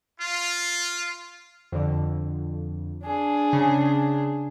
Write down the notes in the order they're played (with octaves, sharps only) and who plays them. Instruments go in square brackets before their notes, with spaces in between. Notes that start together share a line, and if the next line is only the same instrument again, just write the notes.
[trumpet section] F4
[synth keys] F2 D3
[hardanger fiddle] D4 G#4
[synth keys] C#3